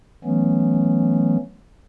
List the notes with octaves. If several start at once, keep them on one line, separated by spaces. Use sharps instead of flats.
E3 F#3 A3 B3 C#4